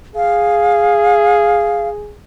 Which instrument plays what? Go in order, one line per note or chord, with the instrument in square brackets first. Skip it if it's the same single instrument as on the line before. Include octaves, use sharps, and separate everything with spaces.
[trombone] G#4 [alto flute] F5